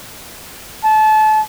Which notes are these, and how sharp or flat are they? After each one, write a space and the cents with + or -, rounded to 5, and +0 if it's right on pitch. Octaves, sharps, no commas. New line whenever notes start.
A5 -30